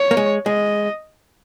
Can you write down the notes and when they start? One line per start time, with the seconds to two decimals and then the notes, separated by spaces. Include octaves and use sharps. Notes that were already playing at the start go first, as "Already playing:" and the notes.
Already playing: C#5
0.11 A#3
0.17 G#3
0.46 G#3 D#5